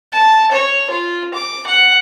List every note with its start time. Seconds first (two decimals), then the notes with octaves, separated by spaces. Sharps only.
0.12 A5
0.52 C#5
0.90 F4
1.34 D6
1.67 F#5